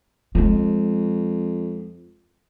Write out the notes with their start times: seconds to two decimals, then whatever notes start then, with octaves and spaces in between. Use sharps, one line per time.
0.35 F2 G#3 C4